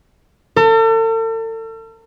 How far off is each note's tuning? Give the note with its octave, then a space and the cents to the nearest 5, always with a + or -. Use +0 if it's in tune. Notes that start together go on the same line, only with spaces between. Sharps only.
A4 +40